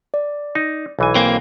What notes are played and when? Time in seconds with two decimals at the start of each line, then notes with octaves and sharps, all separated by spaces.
0.14 D5
0.55 D#4
0.99 B1 E3 G#5
1.15 A#3 C4